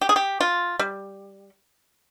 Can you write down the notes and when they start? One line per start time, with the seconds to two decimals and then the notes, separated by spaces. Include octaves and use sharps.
0.01 G4
0.09 G#4
0.16 G4
0.40 F4
0.79 G3